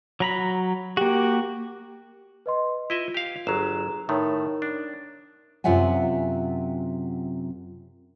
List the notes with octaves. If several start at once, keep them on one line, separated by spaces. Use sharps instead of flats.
F#3 A#5 B5
A#3 F#4 G4
B4 D#5 C6
E4 F4 D#5 E5
G4 F5
G1 F#3 G#4 A#5 E7
A2 D#3 A3 D#4 A#4 C#5
D4
F#2 C3 F4 E5 F#5 G#5